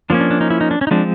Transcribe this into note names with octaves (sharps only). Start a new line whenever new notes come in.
F3 A#3 C#4 D4
D4
D4
D#4
E4
D#4
D4
C#4
D#4
F3 G#3 C4 D4